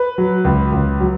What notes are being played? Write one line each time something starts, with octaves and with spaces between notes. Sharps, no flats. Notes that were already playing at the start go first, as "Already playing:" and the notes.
Already playing: B4
F#3
C#2
C#2
F#3